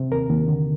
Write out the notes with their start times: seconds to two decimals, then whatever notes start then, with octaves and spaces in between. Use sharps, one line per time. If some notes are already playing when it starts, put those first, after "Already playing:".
Already playing: C3
0.12 D#2 A#4
0.29 D#2
0.48 D3